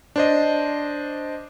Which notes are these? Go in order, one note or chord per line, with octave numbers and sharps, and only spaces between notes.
D4 C5 D#5